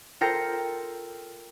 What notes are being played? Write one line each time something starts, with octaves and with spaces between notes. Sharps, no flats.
F4 A4 A#4 G5 A#6 C#7